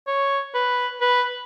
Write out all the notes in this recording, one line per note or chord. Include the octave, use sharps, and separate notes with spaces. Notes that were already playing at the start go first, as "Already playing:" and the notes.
C#5
B4
B4